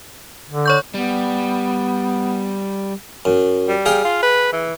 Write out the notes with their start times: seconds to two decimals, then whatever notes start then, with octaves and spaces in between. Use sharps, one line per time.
0.50 D3
0.66 C#5 C#6 G6
0.94 G3 B3
3.25 F#2
3.68 G3
3.86 G#4 F5 G5
4.04 F4
4.23 B4
4.53 E3